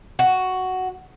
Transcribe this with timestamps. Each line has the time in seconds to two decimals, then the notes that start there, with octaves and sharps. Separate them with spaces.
0.19 F#4